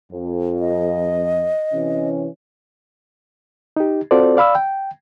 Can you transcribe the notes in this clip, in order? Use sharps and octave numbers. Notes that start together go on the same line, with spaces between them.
F2
D#5
C3 E3 C#4
D#4 G4
C4 F4 F#4 A4 C5 D5
D5 F5 B5 E6
G5